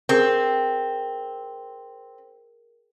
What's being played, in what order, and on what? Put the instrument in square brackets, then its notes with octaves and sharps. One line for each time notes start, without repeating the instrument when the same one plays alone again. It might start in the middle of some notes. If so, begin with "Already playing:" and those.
[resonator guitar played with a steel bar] C4 [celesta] G#4 A#4